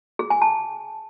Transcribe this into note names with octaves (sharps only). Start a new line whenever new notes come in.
G#4
G#5
A5